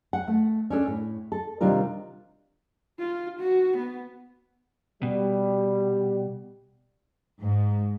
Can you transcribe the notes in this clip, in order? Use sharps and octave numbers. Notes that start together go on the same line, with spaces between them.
F#5
A3
C#4 D4 A4
A2
A4
C3 D#3 G3 D4 F4 A#4
F4
F#4
B3
B2 G3
G#2